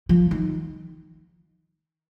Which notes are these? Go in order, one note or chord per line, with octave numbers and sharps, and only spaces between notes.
F3
D#3